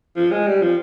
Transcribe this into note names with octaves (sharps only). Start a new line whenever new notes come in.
F3
G#3
G3
F3